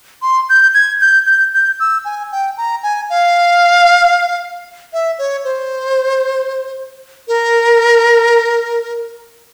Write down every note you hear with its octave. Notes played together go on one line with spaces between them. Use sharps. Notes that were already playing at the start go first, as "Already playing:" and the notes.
C6
G6
G#6
G6
G6
G6
E6
G#5
G5
A#5
G#5
F5
E5
C#5
C5
A#4